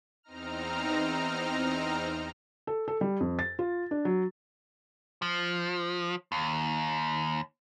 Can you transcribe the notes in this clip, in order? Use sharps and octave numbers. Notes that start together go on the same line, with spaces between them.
E2 C4 D#4 A#5 F6
A4
A4
G3
F2
A6
F4
D4
F#3
F3
D#2